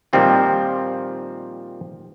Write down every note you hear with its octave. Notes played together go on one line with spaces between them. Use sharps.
A#2 D#3 F3 G3 C4 F4